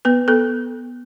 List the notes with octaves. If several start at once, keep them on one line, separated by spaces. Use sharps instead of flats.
B3 B4
B3 A4